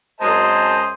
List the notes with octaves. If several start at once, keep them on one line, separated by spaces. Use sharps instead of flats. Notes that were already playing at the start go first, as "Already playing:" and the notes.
F#2 G#3 C5 D#5 A5 A#5